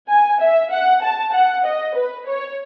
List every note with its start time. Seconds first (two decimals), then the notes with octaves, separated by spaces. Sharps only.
0.08 G#5
0.40 E5
0.71 F#5
1.02 A5
1.33 F#5
1.64 D#5
1.95 B4
2.26 C#5